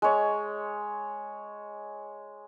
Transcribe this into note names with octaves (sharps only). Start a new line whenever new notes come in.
G#3 C#5